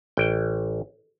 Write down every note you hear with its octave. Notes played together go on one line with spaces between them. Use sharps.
A1 G5